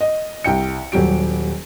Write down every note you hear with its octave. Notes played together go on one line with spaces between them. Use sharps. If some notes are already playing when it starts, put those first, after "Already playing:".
D#5
C2 G5 C#7
D#1 F#3 G3 G4 D7